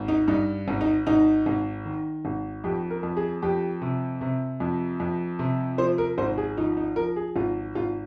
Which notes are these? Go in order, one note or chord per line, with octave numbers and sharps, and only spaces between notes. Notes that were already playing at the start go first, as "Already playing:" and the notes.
Already playing: G#1
D#4
G2 D#4
G#1
D#4
G#1 D#4
G#1
D#3
G#1
F2 G4
A#4
F2
G#4
F2 G4
C3
C3
F2
F2
C3
F3 C5
A#4
G#1 C5
G#4
F3 D#4
D#4
F3 A#4
G#4
G#1 F4
G#1 F4